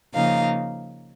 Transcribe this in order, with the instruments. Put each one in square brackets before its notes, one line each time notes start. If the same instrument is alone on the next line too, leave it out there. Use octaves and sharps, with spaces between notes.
[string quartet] C#3 F3 A#3 D#4 F5